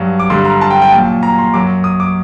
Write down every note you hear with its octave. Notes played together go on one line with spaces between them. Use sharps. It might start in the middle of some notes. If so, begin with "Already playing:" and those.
Already playing: G2 F#3
D6
G2 D3 G3 C6
A#5
A5
G5
G5
A#2 F#3 A5
A#5
C6
F#2 F#3 D6
D#6
D6